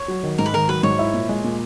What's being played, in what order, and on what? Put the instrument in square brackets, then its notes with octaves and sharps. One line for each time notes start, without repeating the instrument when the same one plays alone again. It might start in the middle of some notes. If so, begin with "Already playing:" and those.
Already playing: [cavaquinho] C#5
[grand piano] F#3
D#3
[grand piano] G#2 [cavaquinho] A#4
[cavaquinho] B4
[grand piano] D#3 [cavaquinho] A#4
[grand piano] F#3 [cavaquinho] B4
[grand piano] G#2 [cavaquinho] C#5
[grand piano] E4
A#2
G#3
A#2